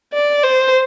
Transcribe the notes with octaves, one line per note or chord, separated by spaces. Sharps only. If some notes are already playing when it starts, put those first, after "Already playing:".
D5
C5